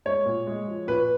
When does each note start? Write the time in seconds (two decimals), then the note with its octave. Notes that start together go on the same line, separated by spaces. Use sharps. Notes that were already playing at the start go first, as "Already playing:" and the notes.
0.05 G#3 C#5
0.25 A#2
0.47 G#3
0.68 F3
0.87 A#2 B4